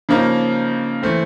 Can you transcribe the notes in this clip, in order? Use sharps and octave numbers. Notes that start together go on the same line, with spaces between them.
C#3 F3 A#3 D#4
E3 A3 C4